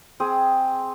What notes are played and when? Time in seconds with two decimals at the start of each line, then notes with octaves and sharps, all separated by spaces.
0.20 C4 G#4